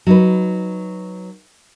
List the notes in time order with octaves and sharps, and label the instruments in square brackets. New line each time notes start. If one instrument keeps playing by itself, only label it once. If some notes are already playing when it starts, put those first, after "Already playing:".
[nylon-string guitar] F#3 D#4 B4